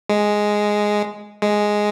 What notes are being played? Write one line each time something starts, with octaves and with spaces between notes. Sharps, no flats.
G#3
G#3